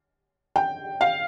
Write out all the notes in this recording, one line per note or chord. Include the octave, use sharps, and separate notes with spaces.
G5
F5